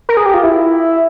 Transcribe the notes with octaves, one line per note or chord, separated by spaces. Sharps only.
A#4
G#4
G4
F4
E4